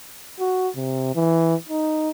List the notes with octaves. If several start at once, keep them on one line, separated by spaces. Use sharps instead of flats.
F#4
C3
E3
D#4